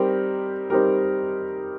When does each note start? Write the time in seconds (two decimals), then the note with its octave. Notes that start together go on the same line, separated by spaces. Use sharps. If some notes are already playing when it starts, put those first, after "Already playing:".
Already playing: G3 C4 D#4 G4 A#4
0.70 G3 C4 D#4 G4 A#4